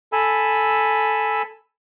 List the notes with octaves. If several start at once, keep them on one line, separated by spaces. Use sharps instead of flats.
A4 G#5 B5 E6